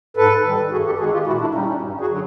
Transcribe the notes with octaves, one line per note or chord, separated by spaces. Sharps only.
G#2 A4 B4
D#3 G3
G2 F#4 G#4
G4 A4
D#3 G#3 F#4 G#4
F4 G4
A#2 E4 F#4
D4 E4
G3 C#4 D#4
C#4 D#4
G2
F#4 G#4
D3 F#3